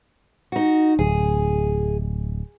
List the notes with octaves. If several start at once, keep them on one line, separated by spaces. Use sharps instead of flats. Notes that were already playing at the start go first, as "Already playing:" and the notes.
D#4 F#4
D1 G#4